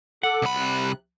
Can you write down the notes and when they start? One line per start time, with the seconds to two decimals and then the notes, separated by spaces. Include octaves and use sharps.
0.23 A4 F#5 D6
0.42 C2 B5
0.57 C3 F#6